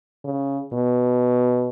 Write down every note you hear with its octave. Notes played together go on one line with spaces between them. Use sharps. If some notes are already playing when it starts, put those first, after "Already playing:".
C#3
B2